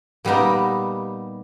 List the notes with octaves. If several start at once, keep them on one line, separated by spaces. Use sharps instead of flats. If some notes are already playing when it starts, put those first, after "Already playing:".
A#2 G3 B3 D#4